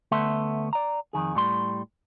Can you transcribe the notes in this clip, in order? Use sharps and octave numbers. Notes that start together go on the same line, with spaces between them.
D2 A3 B3 A4 E5 C6
D5 A#5
F2 G#2 D#3 G#4
A2 G3 C6